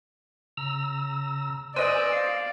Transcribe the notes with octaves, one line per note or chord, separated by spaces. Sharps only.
C#3 A#5 E6
B4 C5 D5 D#5 G#5 E6
F5